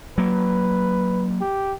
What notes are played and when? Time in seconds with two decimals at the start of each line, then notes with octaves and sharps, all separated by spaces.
0.18 F#3 A#3 B4
1.41 G4